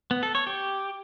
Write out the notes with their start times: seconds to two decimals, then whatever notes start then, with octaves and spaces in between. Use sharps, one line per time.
0.11 B3
0.23 A4
0.35 C#5
0.47 G4